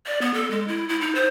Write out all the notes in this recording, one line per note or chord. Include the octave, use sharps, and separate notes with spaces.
D5
B3
A4
G#3
E4
E4
D#4
C5